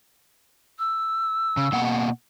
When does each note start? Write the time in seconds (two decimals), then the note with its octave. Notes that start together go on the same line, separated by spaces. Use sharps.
0.79 E6
1.57 C#3
1.72 B2 A#3 F#5